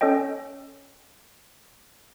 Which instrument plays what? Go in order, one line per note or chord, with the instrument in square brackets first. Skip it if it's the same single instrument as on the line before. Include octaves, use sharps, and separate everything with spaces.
[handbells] C#4 A4 C#5 D#5 G5